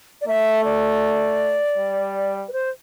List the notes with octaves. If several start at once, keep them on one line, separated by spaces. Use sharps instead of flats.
D5
A3 E5
D5
G3
B4
C5